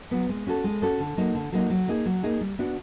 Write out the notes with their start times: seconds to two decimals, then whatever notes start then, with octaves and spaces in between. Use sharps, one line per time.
0.11 F#3 B3
0.29 G#3
0.47 C#4 F#4 A4
0.64 G#3
0.82 C#4 F#4 A4
1.00 D3
1.17 F#3 A#3 D#4
1.35 D3
1.52 F#3 A#3 D#4
1.70 F#3
1.88 A#3 D#4 G#4
2.06 F#3
2.23 A#3 D#4 G#4
2.41 G3
2.59 B3 D4 F#4